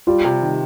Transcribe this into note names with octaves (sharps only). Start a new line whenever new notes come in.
G3 F4
C3
D#3